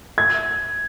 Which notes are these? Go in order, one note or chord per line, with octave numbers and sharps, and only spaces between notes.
G#6